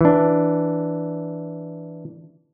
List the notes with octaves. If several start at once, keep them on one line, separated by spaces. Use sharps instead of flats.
E3 D4